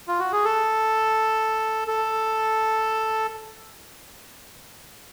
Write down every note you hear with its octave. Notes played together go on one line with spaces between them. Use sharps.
F4
F#4
G#4
A4
A4